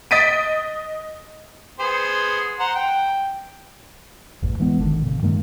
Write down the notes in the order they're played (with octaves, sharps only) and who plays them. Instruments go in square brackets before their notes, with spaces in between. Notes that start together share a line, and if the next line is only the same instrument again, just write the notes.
[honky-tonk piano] D#5 A6 B6 D7 D#7
[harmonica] B3 G#4 C5
C5 F#5 A#5
G5
[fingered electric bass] A1 E2
E3 G#3 B3
G#1 D3 D#3
A#2 C#3
G2 D#3 G#3 A#3